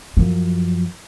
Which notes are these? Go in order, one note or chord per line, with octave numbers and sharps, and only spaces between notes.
F#2 F3